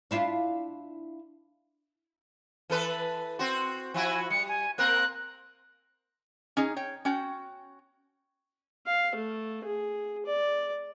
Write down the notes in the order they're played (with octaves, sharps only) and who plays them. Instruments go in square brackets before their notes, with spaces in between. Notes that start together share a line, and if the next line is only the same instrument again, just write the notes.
[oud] D4 E4 F4
[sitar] E3 A4 B4
C4 F#4
[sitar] F3 E4 F#4 [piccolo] G#5
[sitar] G3 [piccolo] C#7
[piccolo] G#5
[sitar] A#3 C4 A#4 [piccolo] F#6
[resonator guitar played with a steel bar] C#4 D#4 G#4
C#5 G5
C#4 F#4 G5
[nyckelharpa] F5
A3
G#4
D5